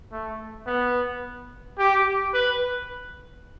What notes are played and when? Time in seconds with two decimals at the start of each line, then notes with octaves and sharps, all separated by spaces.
0.12 A3
0.67 B3
1.79 G4
2.34 B4